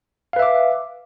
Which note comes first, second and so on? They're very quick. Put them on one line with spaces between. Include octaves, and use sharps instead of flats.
F5 B4 E5 D6